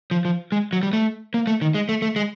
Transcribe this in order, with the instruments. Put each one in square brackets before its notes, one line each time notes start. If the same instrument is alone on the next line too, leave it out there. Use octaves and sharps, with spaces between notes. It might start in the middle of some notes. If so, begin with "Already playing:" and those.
[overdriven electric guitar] F3
F3
G#3
F#3
G3
A3
A#3
A3
D#3
G#3
A3
A3
G#3